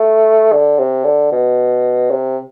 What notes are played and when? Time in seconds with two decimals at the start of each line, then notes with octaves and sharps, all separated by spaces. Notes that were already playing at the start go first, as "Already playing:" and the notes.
Already playing: A3
0.52 D3
0.78 C3
1.04 D3
1.32 B2
2.10 C3